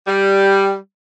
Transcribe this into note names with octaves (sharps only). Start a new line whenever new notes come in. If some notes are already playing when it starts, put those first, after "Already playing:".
G3